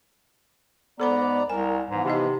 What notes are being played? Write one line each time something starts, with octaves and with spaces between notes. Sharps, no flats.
G#2 B3 A4 C5 D5 A#5 B5
C2 A#4 G#5
G#2 E3 F3 B3
C3 D#4 G4 D#5